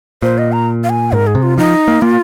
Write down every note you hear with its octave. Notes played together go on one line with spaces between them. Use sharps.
A#2 C5
D#5
A#5
F5
G#5
G#2 A#4
G#4
C3
F4
F3 D#4
A#3
A#3 F4